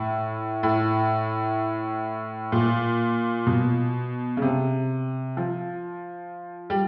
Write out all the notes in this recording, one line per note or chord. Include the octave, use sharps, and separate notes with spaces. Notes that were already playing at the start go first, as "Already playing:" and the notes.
Already playing: A2
A2
A#2
B2
C#3
C3
F3
G3